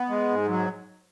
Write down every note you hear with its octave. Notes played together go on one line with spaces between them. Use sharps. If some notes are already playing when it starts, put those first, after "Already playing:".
Already playing: B3
G#3
G#2
F#3